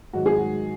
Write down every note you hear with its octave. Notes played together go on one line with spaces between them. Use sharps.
G#2 D#3 F#3 F#4
G#4
F#4